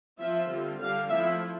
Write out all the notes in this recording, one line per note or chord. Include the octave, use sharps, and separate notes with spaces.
F3 C4 F4 E5
D3 G3 C4 F4
D3 G3 D4 F5
F3 A3 C4 E4 E5